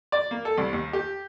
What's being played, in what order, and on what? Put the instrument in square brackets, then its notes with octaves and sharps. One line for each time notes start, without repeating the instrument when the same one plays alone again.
[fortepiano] D5
A#3
A4
C2
D#2
G4